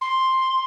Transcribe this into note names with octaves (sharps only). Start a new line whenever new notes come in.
C6